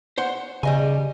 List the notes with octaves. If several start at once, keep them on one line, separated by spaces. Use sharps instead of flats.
C5 F#5 C6
C#3 G3 D#5 G#5